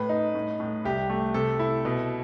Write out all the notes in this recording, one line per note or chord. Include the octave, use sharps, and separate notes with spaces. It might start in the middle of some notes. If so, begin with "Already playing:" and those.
Already playing: A2 B4
D#4
A2
A2
C2 G4
A3
C3 A4
E4
B2